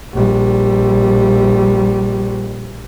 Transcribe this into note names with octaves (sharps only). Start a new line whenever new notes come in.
A#1 G3